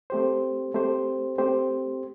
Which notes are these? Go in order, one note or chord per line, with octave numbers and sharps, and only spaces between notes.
A3 C4 G4 C5
A3 C4 G4 C5
A3 C4 G4 C5